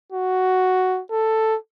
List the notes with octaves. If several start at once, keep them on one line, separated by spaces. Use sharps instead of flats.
F#4
A4